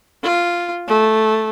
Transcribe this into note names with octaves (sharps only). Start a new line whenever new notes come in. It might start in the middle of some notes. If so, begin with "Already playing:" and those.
F4
A3